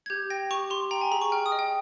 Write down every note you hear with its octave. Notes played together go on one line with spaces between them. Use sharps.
G#6
G4 G6
G5 A#6
G4 C#6
G4 C6
G5 A#5
G#5
G#4 A#5
C#6
G5 F6
D#6
D#5
G5